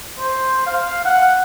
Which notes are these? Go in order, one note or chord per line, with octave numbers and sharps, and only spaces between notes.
C5
F5
F#5